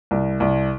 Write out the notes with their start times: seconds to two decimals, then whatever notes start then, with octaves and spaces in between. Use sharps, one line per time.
0.11 C2
0.40 C2